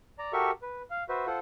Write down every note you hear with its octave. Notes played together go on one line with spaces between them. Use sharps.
D5 A#5
F#4 G4 A4 A#4 E5 C#6
B4
F5
F#4 B4 C5 E5
F4 A4 C5 F#5